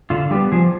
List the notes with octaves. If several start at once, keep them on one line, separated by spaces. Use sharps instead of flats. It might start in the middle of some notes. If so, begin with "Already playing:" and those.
D3 F4
G3 B3 G4
F3 G#4